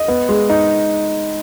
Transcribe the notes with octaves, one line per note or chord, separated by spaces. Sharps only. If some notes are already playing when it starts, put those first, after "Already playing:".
Already playing: D#5
B3
G#3
D#4